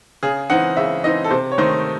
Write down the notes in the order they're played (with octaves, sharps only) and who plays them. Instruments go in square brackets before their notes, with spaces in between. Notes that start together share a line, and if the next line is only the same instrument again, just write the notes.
[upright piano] C#3 G#4
E3 C4 D#4 F#5
C#3 E5
E3 C4 D#4 D#5
A4
C3 C5
C#5
D#3 A3 D#4 C5